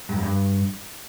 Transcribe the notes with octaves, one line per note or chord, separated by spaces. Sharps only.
G2
F#2
G2